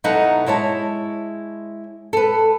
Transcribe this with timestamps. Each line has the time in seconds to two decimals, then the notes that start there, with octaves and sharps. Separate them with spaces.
0.04 B2 F#3 D#4 E4 A4 F#5
0.46 G#3 E4 C#5 A5
2.13 A4 B4